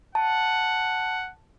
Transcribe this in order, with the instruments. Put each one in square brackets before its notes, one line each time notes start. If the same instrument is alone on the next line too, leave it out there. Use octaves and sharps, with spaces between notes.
[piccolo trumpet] F#5 [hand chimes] A5